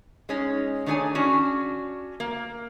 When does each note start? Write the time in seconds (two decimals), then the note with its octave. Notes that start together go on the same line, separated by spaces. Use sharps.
0.29 G#3 C#4 D#4
0.86 D#3 A3 D4 G#4 C#5 G#5
1.15 C#4 D4 F#4
2.20 A#3